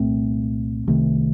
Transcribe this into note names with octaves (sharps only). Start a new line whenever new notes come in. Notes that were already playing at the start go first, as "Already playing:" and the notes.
Already playing: C2 A#2 A3 C4
C2 C3 D#3 A3